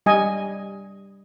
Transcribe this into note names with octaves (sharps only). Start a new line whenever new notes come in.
G3 D#5 G#5